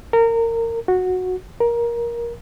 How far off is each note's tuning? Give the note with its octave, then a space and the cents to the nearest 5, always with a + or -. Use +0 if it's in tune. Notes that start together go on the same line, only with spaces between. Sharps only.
A#4 -25
F#4 -10
A#4 +15